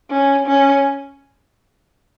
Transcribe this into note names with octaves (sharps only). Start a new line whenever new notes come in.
C#4
C#4